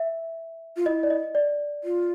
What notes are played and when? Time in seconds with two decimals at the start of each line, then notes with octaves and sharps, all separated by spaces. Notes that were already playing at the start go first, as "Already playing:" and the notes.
Already playing: E5
0.76 F4
0.86 E4 D#5
1.03 D5
1.10 D#5
1.35 D5
1.84 F4